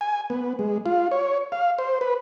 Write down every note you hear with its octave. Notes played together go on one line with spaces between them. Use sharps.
G#5
B3
G#3
F4
C#5
F5
C5
B4